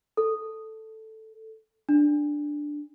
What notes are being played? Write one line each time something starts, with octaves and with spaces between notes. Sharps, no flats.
A4
D4